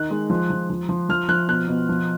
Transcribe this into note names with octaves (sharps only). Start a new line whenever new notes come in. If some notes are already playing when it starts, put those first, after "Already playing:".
Already playing: D#3 F#6
G#3
F3
F3
F3
F3
F3 F6
F3 F#6
B2 F#6
B2
F3